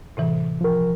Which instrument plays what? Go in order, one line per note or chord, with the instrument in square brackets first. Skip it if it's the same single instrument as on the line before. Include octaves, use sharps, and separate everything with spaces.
[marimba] A2 C3 E3
[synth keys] F3 A#4